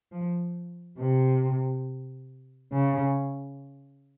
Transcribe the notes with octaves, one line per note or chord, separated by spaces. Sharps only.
F3
C3
C#3